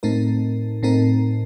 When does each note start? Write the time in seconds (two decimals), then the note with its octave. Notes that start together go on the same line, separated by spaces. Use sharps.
0.03 A2 A3 C4 D#4 A#4
0.83 A2 A3 C4 D#4 A#4